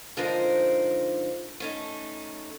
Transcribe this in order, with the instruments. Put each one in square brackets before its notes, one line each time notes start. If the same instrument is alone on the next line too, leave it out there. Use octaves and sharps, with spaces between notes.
[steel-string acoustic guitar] D3 F3 G#3 D#4 A#4 C5
A3 C#4 D#4